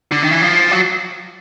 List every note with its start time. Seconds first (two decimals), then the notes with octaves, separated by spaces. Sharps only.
0.12 D3
0.23 D#3
0.31 E3
0.42 F3
0.71 F#3